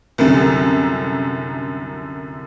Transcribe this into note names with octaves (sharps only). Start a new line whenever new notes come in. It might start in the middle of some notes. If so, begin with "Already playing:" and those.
C2 F#2 D3